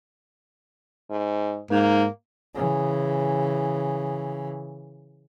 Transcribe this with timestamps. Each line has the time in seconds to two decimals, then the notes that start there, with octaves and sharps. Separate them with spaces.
1.10 G#2
1.70 G#2 A#3
2.55 C#3 E3